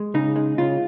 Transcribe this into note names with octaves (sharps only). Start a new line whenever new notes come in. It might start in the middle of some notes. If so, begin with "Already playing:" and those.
Already playing: G#3
C#3 D#4
G#3
C#3 F4